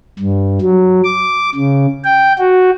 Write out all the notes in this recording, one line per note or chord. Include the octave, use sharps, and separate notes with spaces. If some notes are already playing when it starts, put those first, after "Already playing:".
G2
F#3
D6
C#3
G5
F#4